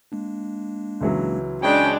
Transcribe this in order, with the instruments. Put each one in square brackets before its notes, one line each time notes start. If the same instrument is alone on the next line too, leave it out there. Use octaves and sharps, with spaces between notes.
[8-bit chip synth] G#3 A#3 D4
[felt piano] C#2 E3 F#3
[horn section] C#3 G5 [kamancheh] G#3 D4 [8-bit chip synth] C#5 D5 G#5